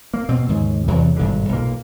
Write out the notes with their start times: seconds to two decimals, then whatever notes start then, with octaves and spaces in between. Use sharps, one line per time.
0.14 A#3
0.29 B2 C4
0.49 D#2 G#2 C#3 G#3
0.88 E2 C3 E3 F#3
1.16 G#1 G2 B2 D3
1.49 B1 A#2 A#3